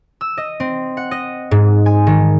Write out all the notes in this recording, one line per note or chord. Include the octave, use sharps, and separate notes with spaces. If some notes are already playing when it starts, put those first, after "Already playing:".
E6
D#5
C4
F#5
D#5
G#2
G#5
D#3